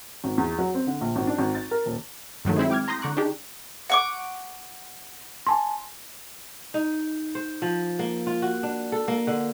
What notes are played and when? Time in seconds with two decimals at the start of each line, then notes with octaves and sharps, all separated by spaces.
0.24 G#1
0.38 E2
0.58 F#3
0.75 C4
0.87 D3
1.01 A#1
1.16 G#1
1.27 D4
1.38 G#1
1.55 A6
1.71 A#4
1.86 D#1
2.45 G2 D#3 F#3 A3
2.56 G#3 A3 C4 E4
2.70 G5 D6 F6 G#6
2.88 A#5 C6 D#6 G6 A#6
3.02 D3 A#5 C#6 D6 F#6
3.17 D4 D#4 G4 G#4
3.90 F#5 C#6 D6
5.47 G#5 A5 C6
6.74 D#4
7.35 C5
7.62 F3
7.99 A#3
8.27 F4
8.42 F#4
8.63 D4
8.92 A4
9.08 A#3
9.27 D3